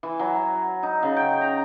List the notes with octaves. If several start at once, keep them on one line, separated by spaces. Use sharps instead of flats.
E3
F#3
D#4
C#3
G5
A#5